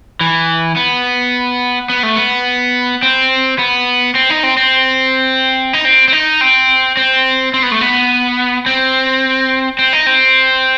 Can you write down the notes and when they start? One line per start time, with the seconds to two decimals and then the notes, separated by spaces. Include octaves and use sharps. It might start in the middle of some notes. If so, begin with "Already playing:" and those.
0.21 E3
0.76 B3
1.90 B3
2.03 A3
2.17 B3
3.02 C4
3.59 B3
4.15 C4
4.30 D#4
4.43 C4
4.57 C4
5.73 D#4
5.85 C4
6.08 C4
6.13 D#4
6.41 C4
6.97 C4
7.54 C4
7.63 B3
7.72 A3
7.81 B3
8.66 C4
9.79 C4
9.93 D#4
10.06 C4